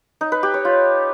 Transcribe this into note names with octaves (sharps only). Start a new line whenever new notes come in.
D#4
B4
G4
C#5
F4